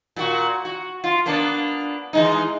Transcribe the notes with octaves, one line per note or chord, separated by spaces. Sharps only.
A#2 F#4
F#4
F4
A#3 B3 D4
E3 G#3 D#4